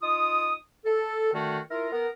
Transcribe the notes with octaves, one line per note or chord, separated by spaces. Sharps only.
D#4 F4 D#6
A4
D3 D#3 A3 F#4 A5
E4 F4 A#4
B3 A#4